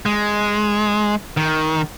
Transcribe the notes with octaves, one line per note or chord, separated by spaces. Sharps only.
G#3
D#3